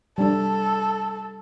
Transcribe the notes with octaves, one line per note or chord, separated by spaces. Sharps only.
G3 D4 A4